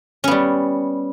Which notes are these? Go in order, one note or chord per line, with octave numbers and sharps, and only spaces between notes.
G3 B3 C#4